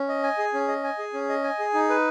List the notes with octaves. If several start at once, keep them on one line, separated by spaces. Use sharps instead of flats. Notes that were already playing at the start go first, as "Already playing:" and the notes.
Already playing: C#4
D#5
G#5
G#4
C#4
D#5
G#5
G#4
C#4
D#5
G#5
G#4
D#4
B4